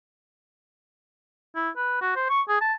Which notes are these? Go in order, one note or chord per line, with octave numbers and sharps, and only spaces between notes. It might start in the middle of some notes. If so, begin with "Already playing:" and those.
E4
B4
F#4
C5
C#6
G#4
A5